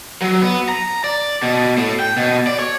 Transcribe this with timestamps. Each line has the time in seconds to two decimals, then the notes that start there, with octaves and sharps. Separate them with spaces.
0.22 F#3
0.42 B3
0.69 A#5
1.04 D5
1.42 B2
1.78 A2
2.00 G5
2.16 B2
2.47 D5
2.59 C#5